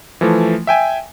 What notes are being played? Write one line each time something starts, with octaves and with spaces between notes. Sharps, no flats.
E3 F3 A3
E5 G5 G#5